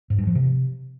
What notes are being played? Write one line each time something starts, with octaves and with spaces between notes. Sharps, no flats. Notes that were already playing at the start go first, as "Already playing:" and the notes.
G#2
G2
F3
C3